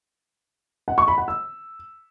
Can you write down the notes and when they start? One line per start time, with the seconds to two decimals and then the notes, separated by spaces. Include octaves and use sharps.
0.88 F#5
0.98 C#6
1.08 B5
1.18 F#5
1.28 E6